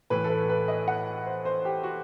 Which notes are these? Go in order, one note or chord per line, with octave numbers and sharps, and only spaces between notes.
A2 E3 B4
A4
B4
B4
D#5
F#5
C5
C5
G4
F#4